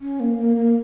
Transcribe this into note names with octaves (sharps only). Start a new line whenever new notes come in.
C#4
A#3
A#3
A#3